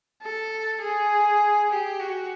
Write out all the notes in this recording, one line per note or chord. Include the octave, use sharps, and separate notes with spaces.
A4
G#4
G4
F#4